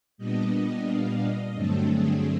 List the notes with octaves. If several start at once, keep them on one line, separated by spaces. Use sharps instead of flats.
A#2 G3 B3 D4 D#5
F5
D#5
G2 D3 F#3 A3 C4 A4
G#4